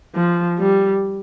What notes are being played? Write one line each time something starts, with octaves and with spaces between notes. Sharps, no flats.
F3
G3